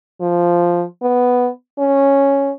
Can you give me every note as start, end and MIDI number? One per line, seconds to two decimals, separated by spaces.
0.21 0.84 53
1.02 1.50 59
1.79 2.52 61